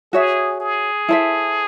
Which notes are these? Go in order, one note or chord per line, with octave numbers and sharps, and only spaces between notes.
F#4 G#4 C#5 E5
G#4
E4 A4 C5 E5